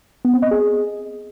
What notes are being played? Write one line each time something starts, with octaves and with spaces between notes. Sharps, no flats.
B3
C4
D#5
G#4